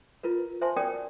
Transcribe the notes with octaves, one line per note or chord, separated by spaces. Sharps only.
E4 F4 A#4 B4
C5 E5 G#5 A5 C6
C#4 F#4 A#4 D5 G5 D#6